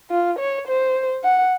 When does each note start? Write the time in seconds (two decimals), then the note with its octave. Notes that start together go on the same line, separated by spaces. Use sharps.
0.11 F4
0.39 C#5
0.67 C5
1.23 F#5